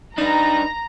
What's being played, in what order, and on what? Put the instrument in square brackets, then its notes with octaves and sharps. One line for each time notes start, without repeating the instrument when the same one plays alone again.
[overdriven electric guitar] D4 B4 [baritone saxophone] D#4 [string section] A#5